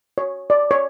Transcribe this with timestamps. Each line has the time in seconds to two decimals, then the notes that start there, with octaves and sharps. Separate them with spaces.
0.18 C#5
0.50 D5
0.71 C#5